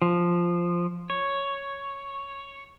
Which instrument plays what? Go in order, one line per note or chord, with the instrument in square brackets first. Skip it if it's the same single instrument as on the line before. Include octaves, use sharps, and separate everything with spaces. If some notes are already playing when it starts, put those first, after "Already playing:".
[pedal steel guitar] F3
C#5